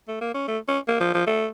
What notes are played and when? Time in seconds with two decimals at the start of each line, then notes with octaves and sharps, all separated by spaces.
0.08 A3
0.21 A#3
0.34 C#4
0.48 A3
0.68 C#4
0.88 A#3
1.01 F3
1.14 F3
1.27 A3